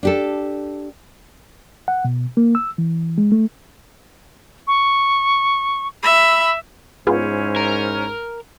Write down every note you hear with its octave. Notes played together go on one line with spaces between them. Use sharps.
D4 G4 A4
F#5
B2
A#3
E6
E3
G#3
A3
C#6
E5 B5
G#2 B3 C#4 E4 F4 G#4 C5
A#4